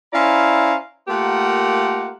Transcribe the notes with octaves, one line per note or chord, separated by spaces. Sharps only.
C#4 E4 C5 D5 F5 A#5
A3 A#3 F4 G4 A#4 F#5